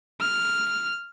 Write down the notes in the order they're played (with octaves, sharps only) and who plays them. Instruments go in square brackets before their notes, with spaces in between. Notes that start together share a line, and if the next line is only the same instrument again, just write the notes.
[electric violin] F6